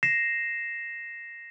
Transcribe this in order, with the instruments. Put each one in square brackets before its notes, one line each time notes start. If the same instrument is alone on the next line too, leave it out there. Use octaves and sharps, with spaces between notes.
[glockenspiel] A#6 C7 E7